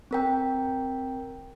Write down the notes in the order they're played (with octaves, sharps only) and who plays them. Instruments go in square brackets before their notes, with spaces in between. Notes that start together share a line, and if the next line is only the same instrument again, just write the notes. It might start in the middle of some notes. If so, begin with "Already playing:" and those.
[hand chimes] C4 A#4 G5